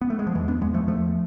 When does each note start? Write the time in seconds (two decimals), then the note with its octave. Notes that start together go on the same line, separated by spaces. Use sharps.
0.01 B3
0.10 A3
0.19 G#3
0.27 F3
0.35 E2 E3
0.48 B3 D4
0.61 E2 G#3 B3
0.74 F3 A3
0.87 E2 F3 A3